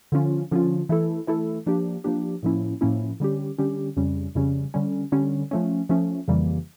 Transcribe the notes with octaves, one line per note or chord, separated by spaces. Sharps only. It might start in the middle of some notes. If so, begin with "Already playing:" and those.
D3 F3 C#4 F4
D3 F3 C#4 F4
E3 A3 E4 A4
E3 A3 E4 A4
F3 A#3 D4 G4
F3 A#3 D4 G4
A2 F3 A#3 C#4 E4
A2 F3 A#3 C#4 E4
D3 G3 C#4 G4
D3 G3 C#4 G4
F2 C#3 G3 C#4
F2 C#3 G3 C#4
D3 G3 C#4
D3 G3 C#4
F3 A3 C#4
F3 A3 C#4
F2 C#3 E3 G3 A#3